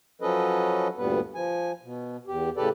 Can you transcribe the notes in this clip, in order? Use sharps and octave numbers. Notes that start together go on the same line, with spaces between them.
F3 F#3 C#4 A4 B4 D#5
D2 G2 A#2 G3 B3 B4
F3 G#5
B2
E2 G4
A2 C#3 G4 A4 B4 D5